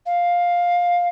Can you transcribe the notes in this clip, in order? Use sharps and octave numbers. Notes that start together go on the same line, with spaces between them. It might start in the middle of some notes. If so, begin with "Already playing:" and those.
F5